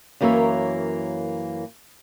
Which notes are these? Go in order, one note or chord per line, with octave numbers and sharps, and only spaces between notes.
F#2 E3 A#3 A#4 C#5 E5